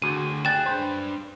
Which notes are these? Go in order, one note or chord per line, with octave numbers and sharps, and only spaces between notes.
D2 F#4 G#4 D#7
G#4 G5 F#6 A6 E7
D4 B4 C5